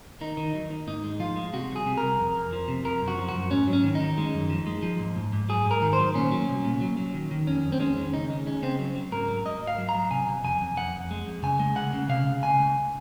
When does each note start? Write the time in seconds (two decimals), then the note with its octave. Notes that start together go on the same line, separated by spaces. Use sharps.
0.21 D#3 D#4
0.37 D#3
0.55 F#3
0.70 D#3
0.87 G#2 D#4
1.04 G#3
1.20 F3 F4
1.36 G#3
1.53 C3 F#4
1.70 C2
1.76 G#4
1.86 C3
1.97 A#4
2.03 C2
2.19 F2
2.36 F2
2.53 F3
2.68 C3
2.84 F3 A#4
3.01 F#2
3.08 F#4
3.18 F3
3.29 F#4
3.35 F#2
3.51 G#2 C#4
3.67 F#3
3.73 C#4
3.84 D#3
3.95 D#4
4.00 D#3
4.18 G#3
4.34 F#2
4.50 F3
4.67 G#3
4.83 F3
4.99 G#2
5.16 G#2
5.33 G#2
5.49 F#3 G#4
5.66 G#2
5.71 A#4
5.82 D#3
5.93 C5
5.99 F#3
6.15 A#2 C#4
6.32 F#3
6.48 C2
6.65 A#2
6.81 F#3
6.97 F#3
7.14 D#3
7.31 D#3
7.47 F2 C#4
7.64 F2
7.72 C4
7.80 G#3 C#4
7.97 D#3
8.13 C#2 D#4
8.30 G#3
8.46 G#3 C#4
8.63 C#3 C4
8.79 F#3
8.96 F#3
9.12 G#2 A#4
9.28 F#3
9.45 G#2 D#5
9.62 G#2
9.67 F5
9.78 F#3
9.89 A#5
9.95 F#3
10.11 C3 G#5
10.28 C3
10.44 F2 G#5
10.61 F2
10.77 F2 F#5
10.94 F2
11.11 G#3
11.27 F2
11.43 C#3 G#5
11.60 G#3
11.76 C#2 F#5
11.93 C#3
12.09 C3 F5
12.26 C#2
12.42 C#2 G#5
12.59 C#2